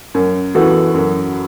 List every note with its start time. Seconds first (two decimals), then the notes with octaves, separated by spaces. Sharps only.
0.14 F#2
0.55 E3 B3 F#4 A4
0.94 F#2